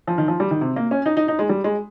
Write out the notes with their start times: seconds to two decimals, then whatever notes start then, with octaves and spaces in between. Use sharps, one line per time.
0.07 F3
0.18 D#3
0.28 F3
0.40 G3
0.51 D#3
0.61 C3
0.76 A#3
0.91 C#4
1.06 D#4
1.17 D#4
1.28 D#4
1.39 G#3
1.49 G3
1.64 G#3